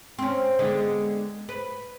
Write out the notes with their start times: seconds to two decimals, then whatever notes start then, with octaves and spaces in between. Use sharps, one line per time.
0.19 C4 C#4
0.59 D3 G#3 B3
1.49 B4